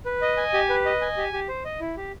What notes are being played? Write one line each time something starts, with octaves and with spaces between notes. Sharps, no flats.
B4
D#5
G#5
G4
B4
D#5
G#5
G4
G4
C5
D#5
E4
G4